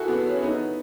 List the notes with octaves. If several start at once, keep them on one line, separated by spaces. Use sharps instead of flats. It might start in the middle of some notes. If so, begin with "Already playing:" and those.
Already playing: E4 F#4 G#4 A4
B3
C#4
B3 D#4